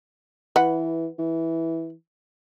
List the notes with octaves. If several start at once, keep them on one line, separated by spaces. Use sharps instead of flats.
E3 B4 F#5
E3